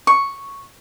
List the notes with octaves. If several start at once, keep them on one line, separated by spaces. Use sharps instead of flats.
C#6